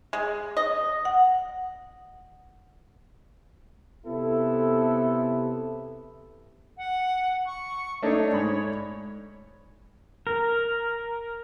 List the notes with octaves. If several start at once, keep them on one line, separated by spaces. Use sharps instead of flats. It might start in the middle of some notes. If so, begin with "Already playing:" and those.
G#3
D#5
F#5
C3 B3 E4 A4
F#5
C#6
A3 D4 D#4 C#5
G#2 B5
A#4